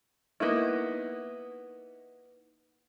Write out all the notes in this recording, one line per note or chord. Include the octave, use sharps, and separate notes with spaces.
A#3 B3 D#4 E4